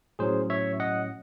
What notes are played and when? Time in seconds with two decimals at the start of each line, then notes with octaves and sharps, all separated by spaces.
0.19 A2 F#3 C#4 G#4 C5
0.50 C#5 E5
0.80 D#5 F#5